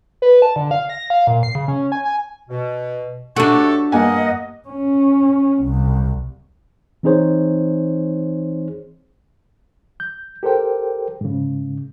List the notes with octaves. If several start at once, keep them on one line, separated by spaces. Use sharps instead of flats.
B4
A5
D3
F5
A#6
F5
A#2
C7
C#3
C#4
G#5
G#5
B2
A2 D4 F#4 G4 A4 C#6
G2 A#3 D#5 F#5 G#5
C#4
C2
E3 C4 D#4 G#4 C5 C#5
G6
G4 A4 A#4 C5 G5
G#2 C#3